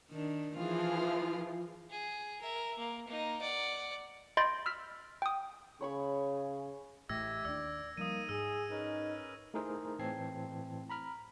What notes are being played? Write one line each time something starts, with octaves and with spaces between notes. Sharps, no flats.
D#3 D4
E3 F3 F4 G#4
G#4
A#4 E5
A#3
A#3 D#4
D5 F#5
D#5 B5 C6 G6 A6 D7
E6 F6 B6
G5 D#6
C#3 C#5 B5 C#6
A1 A2 G4 D#5 E5 E6 G#6 A#6
D#2 D4 D5 E6
F3 G3 A#3 D#4 D#6 D#7
G#2 G#4 E6
C#4 D#4 A#4 B4
A3 D#4 E4 G#4 A#4 C5
A2 E3 C4 A5 G#6 C7
A#5 B5 F6